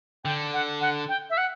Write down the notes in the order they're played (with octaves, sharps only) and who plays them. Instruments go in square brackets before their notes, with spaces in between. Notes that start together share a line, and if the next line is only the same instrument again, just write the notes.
[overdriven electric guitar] D3 [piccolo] G5
[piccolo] F#5
F#5
G5
E5
F#5